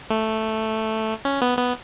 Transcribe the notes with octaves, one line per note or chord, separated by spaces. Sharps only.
A3
C#4
B3
B3